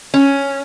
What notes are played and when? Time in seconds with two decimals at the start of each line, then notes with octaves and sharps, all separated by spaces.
0.14 C#4